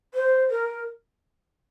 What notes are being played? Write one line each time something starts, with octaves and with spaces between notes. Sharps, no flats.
C5
A#4